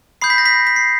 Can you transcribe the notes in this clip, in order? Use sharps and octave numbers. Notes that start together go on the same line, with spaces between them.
B5 D#6 G6 C7
B6
A#6
B6
B6
C7